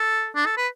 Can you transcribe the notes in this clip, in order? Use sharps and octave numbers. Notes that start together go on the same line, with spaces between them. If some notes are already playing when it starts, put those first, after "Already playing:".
Already playing: A4
D4
A4
B4